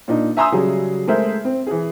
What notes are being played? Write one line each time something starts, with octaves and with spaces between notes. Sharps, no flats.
A#2 D4 D#4
E5 G#5 A#5 C6 D#6 E6
C#3 F#3 G3 G#4
G#3 A3 G#4 A#4 C5 E5
C4
E3 G#4